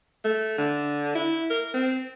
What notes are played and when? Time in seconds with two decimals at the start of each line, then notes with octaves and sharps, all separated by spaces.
0.25 A3
0.58 D3
1.15 E4
1.50 A#4
1.74 C4